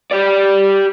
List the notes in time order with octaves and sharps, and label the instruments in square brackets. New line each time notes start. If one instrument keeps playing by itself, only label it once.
[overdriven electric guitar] G4 D5